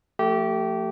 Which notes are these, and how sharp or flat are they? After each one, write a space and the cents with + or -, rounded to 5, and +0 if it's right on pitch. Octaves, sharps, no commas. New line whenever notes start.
F3 +0 A3 +20 G4 -20